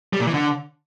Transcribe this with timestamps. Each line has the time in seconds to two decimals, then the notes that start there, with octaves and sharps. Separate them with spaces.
0.13 G3
0.20 A#2
0.27 E3
0.34 D3